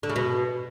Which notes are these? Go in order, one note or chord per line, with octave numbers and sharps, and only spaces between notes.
D3
C#3
B2